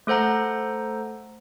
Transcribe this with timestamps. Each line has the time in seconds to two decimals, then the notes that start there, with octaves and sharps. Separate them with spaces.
0.07 A3 A4 C5 F#5 A#5